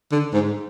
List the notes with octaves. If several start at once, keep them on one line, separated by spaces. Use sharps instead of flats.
D3
G#2